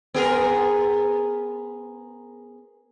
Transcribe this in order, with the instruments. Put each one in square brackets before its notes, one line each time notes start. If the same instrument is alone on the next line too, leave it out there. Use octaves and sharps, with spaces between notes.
[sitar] B3 G#4 A#4